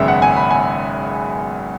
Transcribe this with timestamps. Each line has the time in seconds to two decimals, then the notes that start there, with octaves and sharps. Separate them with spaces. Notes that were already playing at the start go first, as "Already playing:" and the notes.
Already playing: G#1 F#2 C#3 B3 E5
0.08 F#5
0.22 G#5
0.37 B5
0.51 G#5